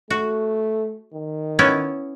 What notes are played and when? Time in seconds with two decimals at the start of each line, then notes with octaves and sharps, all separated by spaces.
0.10 A3 F#4
1.13 D#3
1.59 B3 C#4 E4